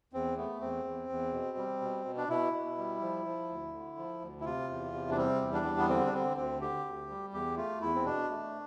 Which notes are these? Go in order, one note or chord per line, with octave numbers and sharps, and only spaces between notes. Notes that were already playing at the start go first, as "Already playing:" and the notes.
E2 C4
A3 B3
E2 C4
E2
E2
B2
G3
B2
B2
D4
B2 E4
B2
G3
F3
F3
D2
D3
F3
D2
E4
C3 F4
E2
C3
D4
G3 C4
E2
D4
G3
B3
D3 C4
D4
D3 C4
D2 C4
D3 G4
D2
G3
E2 G4
A3 F4
E2 E4
C4
B2 D4
A3